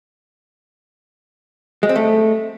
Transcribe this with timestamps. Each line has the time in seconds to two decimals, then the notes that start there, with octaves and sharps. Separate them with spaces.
1.83 G#3
1.89 C4
1.96 A3